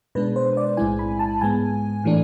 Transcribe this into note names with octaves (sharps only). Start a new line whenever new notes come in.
B2 G#3 D4 B4
C5
D5
B1 A2 G#3 C4 E4 G#5
B5
A5
G#2 G#3 B3 G#5
A2 E3 A3 D4